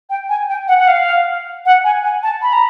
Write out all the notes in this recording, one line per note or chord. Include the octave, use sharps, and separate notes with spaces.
G5
G#5
G5
F#5
F#5
F5
F#5
G#5
G#5
A5
B5
A#5